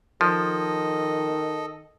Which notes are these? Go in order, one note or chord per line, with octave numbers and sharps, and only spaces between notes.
D#3 F3 A4 D#5